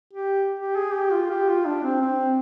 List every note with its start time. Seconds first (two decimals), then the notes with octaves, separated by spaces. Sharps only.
0.13 G4
0.59 G4
0.76 G#4
0.94 G4
1.12 F4
1.30 G4
1.48 F4
1.65 D4
1.83 C4
2.01 C4